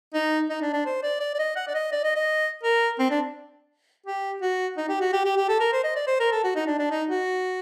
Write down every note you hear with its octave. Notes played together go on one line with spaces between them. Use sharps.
D#4
D#4
D4
D4
C5
D5
D5
D5
D#5
F#5
D5
D#5
D5
D#5
D#5
A#4
C4
D4
G4
F#4
D#4
G4
F#4
G4
G4
G4
A4
A#4
C5
D#5
D5
C5
A#4
A4
F#4
D#4
D4
D4
D#4
F#4